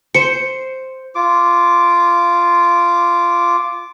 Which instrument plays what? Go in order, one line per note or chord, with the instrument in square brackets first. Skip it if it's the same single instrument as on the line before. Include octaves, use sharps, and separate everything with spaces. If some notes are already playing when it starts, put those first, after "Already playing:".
[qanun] C5 [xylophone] C#7
[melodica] F4 D6